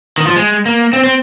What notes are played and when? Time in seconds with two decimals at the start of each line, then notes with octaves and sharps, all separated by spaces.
0.18 D#3
0.27 F3
0.36 G#3
0.66 A#3
0.93 C4
1.04 C4